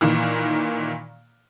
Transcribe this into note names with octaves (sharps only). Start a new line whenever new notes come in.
A#2 D#3 E3